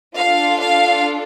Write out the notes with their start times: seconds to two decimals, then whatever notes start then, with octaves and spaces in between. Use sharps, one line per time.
0.17 D4 F4 A4 F5
0.61 F5